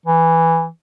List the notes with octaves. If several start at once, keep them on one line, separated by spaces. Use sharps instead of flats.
E3